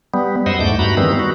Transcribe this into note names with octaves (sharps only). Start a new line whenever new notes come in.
G3 B3
F#2 C5 D#5 F#5 E6
E2 G#2 A3 D6 G6
G2 F#4 A#5 B5
D#3 E3 G3 B3 C4
F#4